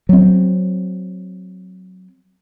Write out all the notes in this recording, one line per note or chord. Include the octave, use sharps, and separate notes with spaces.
F#3 C4